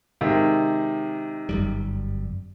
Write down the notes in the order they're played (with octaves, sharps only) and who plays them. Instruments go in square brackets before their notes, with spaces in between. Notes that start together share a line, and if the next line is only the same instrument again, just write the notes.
[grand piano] C3 D#3 G#3
[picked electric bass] G1 F#2 G3